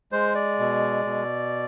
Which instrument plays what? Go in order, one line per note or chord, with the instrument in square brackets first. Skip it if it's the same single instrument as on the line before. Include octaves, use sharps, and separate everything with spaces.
[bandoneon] G#3 C5
D5
B2
B2